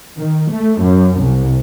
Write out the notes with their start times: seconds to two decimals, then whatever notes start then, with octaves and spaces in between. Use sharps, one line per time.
0.20 D#3
0.51 A3
0.82 F#2
1.21 C2